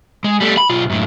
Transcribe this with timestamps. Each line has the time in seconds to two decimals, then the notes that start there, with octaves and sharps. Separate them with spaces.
0.24 G#3
0.40 G3 A3
0.58 B5
0.70 B1 F4
0.90 F#2 A2